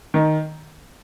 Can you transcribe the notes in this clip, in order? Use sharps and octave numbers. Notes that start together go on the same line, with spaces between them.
D#3